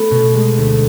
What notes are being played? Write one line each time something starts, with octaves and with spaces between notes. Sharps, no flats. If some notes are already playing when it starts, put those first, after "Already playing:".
Already playing: A3 B3
B2
G#3
D2